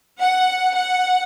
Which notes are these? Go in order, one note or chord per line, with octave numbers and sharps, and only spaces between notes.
F#5
F#5